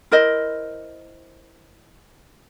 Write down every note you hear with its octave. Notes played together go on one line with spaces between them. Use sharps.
E4 A#4 C5 D#5